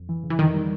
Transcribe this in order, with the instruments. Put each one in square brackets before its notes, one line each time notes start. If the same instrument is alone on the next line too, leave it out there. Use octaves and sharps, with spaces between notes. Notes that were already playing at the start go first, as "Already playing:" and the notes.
Already playing: [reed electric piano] F2
E3
C#3
[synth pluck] E3
[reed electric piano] F2 [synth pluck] D#3
[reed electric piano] G3